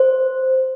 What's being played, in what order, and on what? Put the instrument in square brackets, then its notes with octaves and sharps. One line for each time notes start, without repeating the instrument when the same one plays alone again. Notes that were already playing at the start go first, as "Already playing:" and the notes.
Already playing: [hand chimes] C5